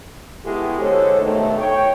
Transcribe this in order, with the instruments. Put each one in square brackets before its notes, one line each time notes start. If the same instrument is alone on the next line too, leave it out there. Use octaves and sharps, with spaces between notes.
[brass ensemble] G#3 B3 E4 F#4 G4 A4
D3 G#3 A4 C5 C#5
G2 B2 D#3 A3
C#5 G5